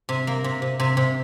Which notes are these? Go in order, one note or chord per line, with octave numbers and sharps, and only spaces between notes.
C3
A#3
C3
C3
C3
C3